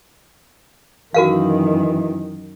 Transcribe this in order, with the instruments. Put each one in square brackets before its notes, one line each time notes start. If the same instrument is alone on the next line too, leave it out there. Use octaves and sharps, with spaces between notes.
[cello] F#2 D#3 [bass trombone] E3 [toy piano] F#4 A#4 F5